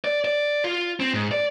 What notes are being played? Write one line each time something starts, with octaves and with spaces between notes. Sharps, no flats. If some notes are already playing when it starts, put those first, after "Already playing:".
D5
D5
F4
C4
G#2
D5